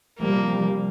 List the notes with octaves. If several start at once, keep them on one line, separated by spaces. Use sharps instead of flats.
C3 F3 G3 A#3